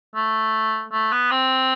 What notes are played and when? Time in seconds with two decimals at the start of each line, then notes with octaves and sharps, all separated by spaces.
0.16 A3
0.92 A3
1.12 B3
1.31 C4